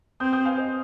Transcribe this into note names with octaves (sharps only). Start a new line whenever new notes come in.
C4 D#6 G6
D#6 G6
F5 G#5
C5 D#5